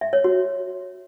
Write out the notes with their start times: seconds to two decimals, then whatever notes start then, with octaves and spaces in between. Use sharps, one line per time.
0.01 E5
0.13 C#5
0.24 F#4